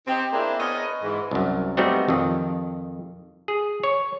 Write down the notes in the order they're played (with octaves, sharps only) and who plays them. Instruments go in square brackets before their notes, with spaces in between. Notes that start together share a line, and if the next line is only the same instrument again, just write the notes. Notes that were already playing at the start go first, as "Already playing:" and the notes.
[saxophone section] C4 D#4 G4
A#3 C4 D4 E4 G#4 C5
B3 G#4 A#4 C#5 D#5
G#2 E3
[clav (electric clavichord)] C2 F#2
G3 A3 B3 C4 D#4 F#4
F2 D#3
G#4
C#5